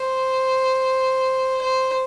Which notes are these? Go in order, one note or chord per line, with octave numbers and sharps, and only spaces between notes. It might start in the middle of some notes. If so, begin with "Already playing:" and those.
Already playing: C5
C5